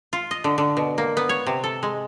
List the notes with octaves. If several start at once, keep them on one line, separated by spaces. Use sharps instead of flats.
F4
D#5
D3
D3
B2
A#3
B3
C#5
C3
A4
G#3